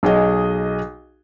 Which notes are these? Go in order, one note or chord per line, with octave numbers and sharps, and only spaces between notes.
B1 G#4 D#5